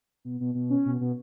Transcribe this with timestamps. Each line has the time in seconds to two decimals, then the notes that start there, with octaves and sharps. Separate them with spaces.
0.25 B2
0.40 B2
0.55 B2
0.70 C#4
0.86 B2
1.01 B2